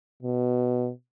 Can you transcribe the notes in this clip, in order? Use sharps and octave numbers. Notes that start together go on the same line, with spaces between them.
B2